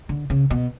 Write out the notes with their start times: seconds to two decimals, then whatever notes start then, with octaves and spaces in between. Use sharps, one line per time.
0.09 D3
0.30 C#3
0.50 B2